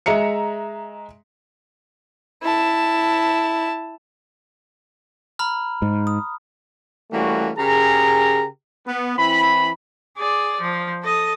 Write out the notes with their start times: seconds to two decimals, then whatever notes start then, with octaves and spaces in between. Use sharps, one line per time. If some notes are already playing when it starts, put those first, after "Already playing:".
0.06 G#3 E5 A#5 C#7
2.43 E4 A5
5.39 A#5 B5 F6
5.82 G#2
6.07 D#6
7.12 E3 G3 A3 A#3 C#4 F#4
7.58 C#3 G4 G#4 A#4 A#5
8.86 B3
9.18 E3 C4 E4 B5
10.18 G#4 D5
10.61 F3
11.03 A4 D#5